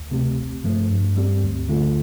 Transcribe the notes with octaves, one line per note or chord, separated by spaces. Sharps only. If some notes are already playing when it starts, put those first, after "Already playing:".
Already playing: D2
C3 A3 C4 G4
G1
G2 F3 A3
G2
G3 C4 G4
D2
D3 A3 F4